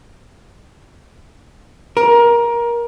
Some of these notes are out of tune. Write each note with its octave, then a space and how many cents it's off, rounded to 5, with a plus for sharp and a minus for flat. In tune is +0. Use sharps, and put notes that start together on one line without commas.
A#4 +20